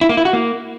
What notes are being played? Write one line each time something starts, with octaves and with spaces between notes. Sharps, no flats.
E4
A#3
E4
F#4
A#3